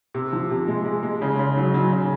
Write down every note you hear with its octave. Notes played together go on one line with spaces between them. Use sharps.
C3
F3
C3
G#3
G#3
G#3
C#3
C#3
F#3
F#3
C#3